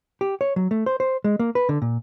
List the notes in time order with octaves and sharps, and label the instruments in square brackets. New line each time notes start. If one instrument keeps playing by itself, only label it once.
[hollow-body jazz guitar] G4
C#5
F#3
A3
C5
C5
G#3
A#3
B4
D3
A#2